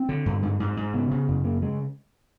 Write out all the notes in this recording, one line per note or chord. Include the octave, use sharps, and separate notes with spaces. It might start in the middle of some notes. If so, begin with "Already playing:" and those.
Already playing: C4
D3
G2
G#2
G#2
G#2
C#3 B3
C#3
F#2
C#3 A#3
C#3 G#3